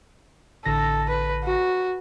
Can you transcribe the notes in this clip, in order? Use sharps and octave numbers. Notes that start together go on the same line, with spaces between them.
A1 D3 A4 A#6
B4
F#4